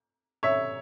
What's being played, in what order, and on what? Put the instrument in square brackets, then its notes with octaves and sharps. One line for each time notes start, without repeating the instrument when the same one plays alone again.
[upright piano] C#5 E5